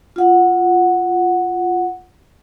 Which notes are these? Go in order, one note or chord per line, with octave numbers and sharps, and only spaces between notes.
F4 F#5